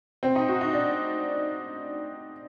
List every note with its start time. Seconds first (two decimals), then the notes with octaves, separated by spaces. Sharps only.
0.23 C4
0.36 D#4
0.48 F#4
0.61 D#4
0.73 D4